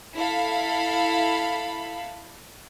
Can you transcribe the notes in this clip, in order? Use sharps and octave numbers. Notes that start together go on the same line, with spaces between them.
E4 A4 F5 B5